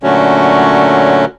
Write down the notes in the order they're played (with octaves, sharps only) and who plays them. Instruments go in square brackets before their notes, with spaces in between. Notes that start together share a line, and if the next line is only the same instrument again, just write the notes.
[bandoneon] A#2 D3 F#3 A3 C#4 F#4